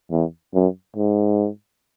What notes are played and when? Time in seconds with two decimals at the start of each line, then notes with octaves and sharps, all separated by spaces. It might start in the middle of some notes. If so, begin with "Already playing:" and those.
0.11 E2
0.54 F#2
0.97 G#2